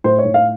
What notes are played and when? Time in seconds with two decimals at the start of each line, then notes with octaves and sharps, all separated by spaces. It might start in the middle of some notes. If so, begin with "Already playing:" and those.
0.04 A2 C5
0.19 C#5
0.25 A2
0.34 F5